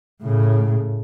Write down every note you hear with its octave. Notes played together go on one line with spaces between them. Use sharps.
A2 C#3